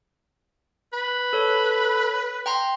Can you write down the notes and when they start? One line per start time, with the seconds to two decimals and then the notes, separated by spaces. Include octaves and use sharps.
0.93 B4
1.33 A4 C#5
2.46 G5 A#5 C6